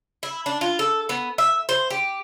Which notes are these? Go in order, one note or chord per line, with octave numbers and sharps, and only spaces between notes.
E4
D4
F4
A4
B3
E5
C5
G4